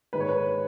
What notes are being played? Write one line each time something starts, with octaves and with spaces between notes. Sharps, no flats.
G#2 D#3 G#3 B4
C#5
B4